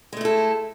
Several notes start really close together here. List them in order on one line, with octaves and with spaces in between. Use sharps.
G#3 A3 E4 A4